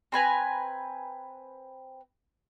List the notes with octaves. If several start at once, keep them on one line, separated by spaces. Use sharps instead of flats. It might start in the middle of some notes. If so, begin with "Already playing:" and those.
C4 B4 G#5 A#5